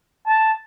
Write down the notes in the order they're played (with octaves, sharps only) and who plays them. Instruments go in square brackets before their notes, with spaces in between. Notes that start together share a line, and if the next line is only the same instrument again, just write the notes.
[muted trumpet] A5